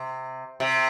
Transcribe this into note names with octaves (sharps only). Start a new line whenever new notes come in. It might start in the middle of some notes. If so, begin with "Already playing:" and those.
Already playing: C3
C3